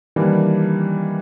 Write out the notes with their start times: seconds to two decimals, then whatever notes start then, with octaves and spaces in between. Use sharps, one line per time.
0.16 D#3 E3 G3 A#3 D4